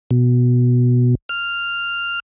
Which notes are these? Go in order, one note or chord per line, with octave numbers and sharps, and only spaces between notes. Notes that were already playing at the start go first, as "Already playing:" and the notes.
B2
F6